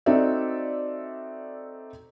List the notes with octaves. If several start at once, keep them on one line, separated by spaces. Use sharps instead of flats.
C4 D#4 F#4 A4 D5 E5